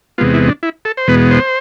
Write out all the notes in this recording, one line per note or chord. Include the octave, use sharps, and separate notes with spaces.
E2 C3 G#3 B3 F4
E4
D4
E4
A4
C5
E2 B2 G#3 B3 B4
C5